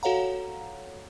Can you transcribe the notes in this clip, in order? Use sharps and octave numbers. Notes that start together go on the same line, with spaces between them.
F#4 A4 C#5 F5 F#5 A#5